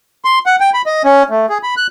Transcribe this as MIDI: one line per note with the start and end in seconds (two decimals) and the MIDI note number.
0.25 0.39 84
0.46 0.56 78
0.60 0.70 79
0.74 0.82 83
0.86 1.02 75
1.04 1.23 61
1.30 1.46 57
1.49 1.58 68
1.63 1.75 83
1.77 1.87 90